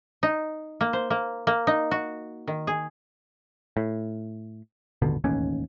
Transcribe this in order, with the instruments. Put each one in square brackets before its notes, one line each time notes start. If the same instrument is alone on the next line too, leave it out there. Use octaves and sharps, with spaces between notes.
[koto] D#4
A#3
C5
A#3
A#3
D#4
F#4
D#3
G#4
[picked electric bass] A2
D#1 G#1 B2 D3
E1 A1 D#2 C#4